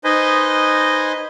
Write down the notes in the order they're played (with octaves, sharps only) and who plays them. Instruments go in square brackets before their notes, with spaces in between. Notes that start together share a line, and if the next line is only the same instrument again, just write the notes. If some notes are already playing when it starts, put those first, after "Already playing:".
[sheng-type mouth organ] D#4 B4 C5 D#5 G#5